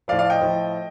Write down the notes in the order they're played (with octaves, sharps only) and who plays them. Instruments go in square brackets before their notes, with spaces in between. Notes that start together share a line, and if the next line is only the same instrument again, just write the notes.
[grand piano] F3 D5 F5
A2
D5 F5
D#5 G5
A2 F3